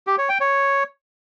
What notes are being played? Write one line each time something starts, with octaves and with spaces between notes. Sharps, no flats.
G4
C#5
G5
C#5